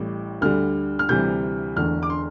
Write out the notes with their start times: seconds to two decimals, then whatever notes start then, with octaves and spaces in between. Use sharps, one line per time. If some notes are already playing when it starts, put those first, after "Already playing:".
Already playing: A1 A2 G3
0.41 D2 D3 G3 F6
0.99 F6
1.09 D2 C3 E3 G3 G6
1.76 E1 E2 D3 A3 F6
2.03 D6
2.10 C6